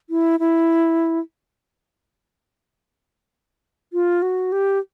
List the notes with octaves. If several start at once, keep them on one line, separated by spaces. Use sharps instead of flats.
E4
E4
F4
F#4
G4